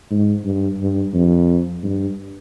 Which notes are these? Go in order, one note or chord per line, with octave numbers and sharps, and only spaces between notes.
G#2
G2
G2
F2
G2